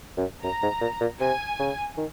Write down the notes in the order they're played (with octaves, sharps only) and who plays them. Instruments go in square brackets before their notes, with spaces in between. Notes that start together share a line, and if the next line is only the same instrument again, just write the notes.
[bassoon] F#2
[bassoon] F#2 [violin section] A#5
[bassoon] G#2
A#2
A#2
[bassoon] C3 [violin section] G#5
[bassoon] C#3
D#3